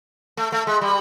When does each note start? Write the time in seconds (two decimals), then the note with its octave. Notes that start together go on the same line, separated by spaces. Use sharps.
0.37 A3
0.52 A3
0.67 G#3
0.81 G3